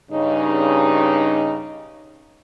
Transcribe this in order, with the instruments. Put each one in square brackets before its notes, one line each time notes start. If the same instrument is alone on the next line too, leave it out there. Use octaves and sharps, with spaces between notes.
[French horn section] G2 C#3 D#4